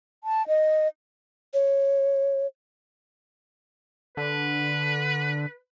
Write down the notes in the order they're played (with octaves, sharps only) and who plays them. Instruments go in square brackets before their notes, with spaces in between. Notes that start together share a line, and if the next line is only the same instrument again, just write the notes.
[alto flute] A5
D#5
[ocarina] C#5
[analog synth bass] D3 [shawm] B4